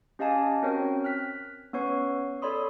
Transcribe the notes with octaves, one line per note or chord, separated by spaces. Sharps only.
C#4 G4 D#5 F5 G#5 A5
C4 C#4 F#4 A#4 C#5 G5
F6 F#6 B6
B3 C#4 B4 C#5 C#6 C7
A4 C#5 D5 B5 C6 D#6